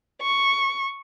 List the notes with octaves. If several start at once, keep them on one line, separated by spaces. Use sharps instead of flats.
C#6